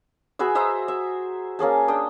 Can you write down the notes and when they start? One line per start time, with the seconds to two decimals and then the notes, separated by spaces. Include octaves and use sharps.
0.39 F#4 G#4 B4 E5
0.55 C5 D#5 E5 A#5
0.88 E5
1.59 A#3 C#4 G#4 A5
1.88 D4 G5 D#6